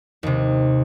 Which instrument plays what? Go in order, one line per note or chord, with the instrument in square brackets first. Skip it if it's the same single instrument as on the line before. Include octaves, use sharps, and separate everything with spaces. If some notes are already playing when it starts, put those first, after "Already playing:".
[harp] D#2 C3